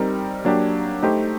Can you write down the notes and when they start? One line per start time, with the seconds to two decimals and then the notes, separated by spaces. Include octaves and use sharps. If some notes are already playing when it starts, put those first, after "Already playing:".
Already playing: G3 C4 D#4 G4 A#4
0.45 F#3 A#3 D4 G4
1.02 A3 D#4 G4 C5